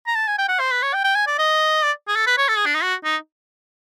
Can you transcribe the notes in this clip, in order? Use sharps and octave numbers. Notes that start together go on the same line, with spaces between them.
A#5
A5
G#5
G5
F#5
C5
B4
C#5
G5
G5
G#5
D5
D#5
D5
G#4
A4
B4
C#5
A4
G#4
D4
D#4
F#4
D#4